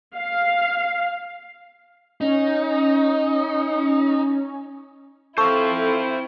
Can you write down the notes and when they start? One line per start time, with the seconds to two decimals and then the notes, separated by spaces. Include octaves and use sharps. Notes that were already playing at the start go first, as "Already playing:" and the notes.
0.16 F5
2.21 C#4 D#4
5.38 C4 E4 A4 C5 F5 C#6